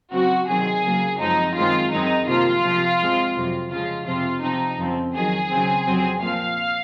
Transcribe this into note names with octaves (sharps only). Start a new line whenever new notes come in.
C#3 F#3 C4 F#4
C3 D#3 F#3 C4 G#4
C#3 F#3 A#3
F#2 F3 G#3 C4 D#4
F#2 D#3 G#3 C4 F4
F#2 D#3 G#3 C4 D#4
C3 F3 A#3 F4
C3 F3 C4
G#2 F3 G#3 C4
F2 C3 F#3
C#3 F3 G#3 F4
F2 C3 F3 C4 F4
C3 F3 C4 D#4
F2 C#3 F3 C4
F2 D#3 F#3 G#4
C#3 F#3 C4
F2 C3 F#3 C4
A#2 F3 C4 F5